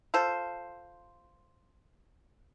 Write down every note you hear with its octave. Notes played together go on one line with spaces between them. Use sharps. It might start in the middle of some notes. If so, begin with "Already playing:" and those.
F4 A4 C5